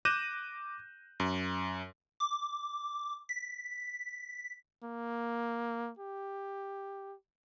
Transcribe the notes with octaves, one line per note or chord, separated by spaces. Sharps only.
D6 F#6 G6 A#6 D#7 E7
F#2
D6
B6
A#3
G4